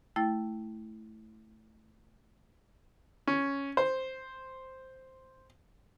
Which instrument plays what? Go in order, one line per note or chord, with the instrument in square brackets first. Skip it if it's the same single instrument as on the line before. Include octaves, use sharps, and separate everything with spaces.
[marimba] A3 E4 G5 A6
[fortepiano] C#4
C5